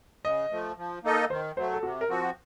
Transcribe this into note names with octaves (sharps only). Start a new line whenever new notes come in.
C#3 D#5
F3 A3
F3
A#3 D#4 A4 D#5
D#3 C5
F#3 A3 C5
A4
C3 F#4
A#4
F3 C4 F#4